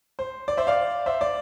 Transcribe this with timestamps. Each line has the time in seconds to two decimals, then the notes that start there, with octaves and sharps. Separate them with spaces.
0.19 C5
0.48 D5
0.57 C5 E5
0.67 D5 F5
1.06 C5 E5
1.21 D5